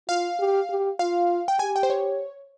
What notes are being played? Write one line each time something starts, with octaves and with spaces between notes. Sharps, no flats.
F4 F5
G4
G4
F4 F5
G5
G4 G#5
G5
C5
C#5